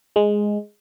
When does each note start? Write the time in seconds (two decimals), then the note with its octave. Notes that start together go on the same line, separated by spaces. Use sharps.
0.16 G#3